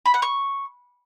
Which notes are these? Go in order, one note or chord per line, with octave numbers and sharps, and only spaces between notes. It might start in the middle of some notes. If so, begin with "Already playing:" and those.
B5
F#5
C#6